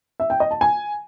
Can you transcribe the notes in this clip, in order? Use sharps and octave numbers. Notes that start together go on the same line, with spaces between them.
E5
G5
D#5
A5
G#5